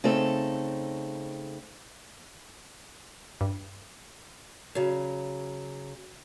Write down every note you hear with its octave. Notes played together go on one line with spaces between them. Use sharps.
C#3 A3 C4 D#4 A4
G2
C#3 F#3